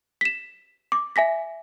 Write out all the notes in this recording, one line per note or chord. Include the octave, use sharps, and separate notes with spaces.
B6 E7
D6
E5 G#5 A#6 B6